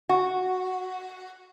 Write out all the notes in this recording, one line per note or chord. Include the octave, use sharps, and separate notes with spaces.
F#4